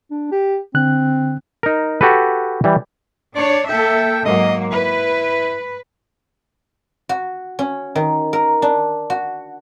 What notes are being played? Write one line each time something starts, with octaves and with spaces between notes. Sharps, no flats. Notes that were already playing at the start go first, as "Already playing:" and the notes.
D4
G4
D3 C4 F#6
D#4 A#4
F#4 G4 A4 B4
E3 G3
D4 C#5 D5
A#3 A4 E5 G5
G#2 F#3 A#3 D#5
E4 B4
F#4
C#4
D#3
A#4
D4
F#4